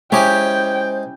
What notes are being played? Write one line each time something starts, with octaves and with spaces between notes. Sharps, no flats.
G#3 C#4 E4 G4 C5 D#5 G5 G#5